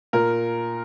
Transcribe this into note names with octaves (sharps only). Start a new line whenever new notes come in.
A#2 A#4